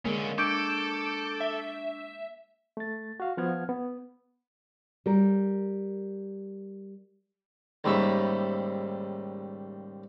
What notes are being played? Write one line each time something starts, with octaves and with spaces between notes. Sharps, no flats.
D3 G#3 A#3 C#4 A#4
D4 A4 C#6 D6 G6 G#6 D7
E5
A3 A6
F#4 F5
F3 B3 F#5 F6 G#6
B3
G3 A#4
D#2 G#2 C#3 G3 E5 B5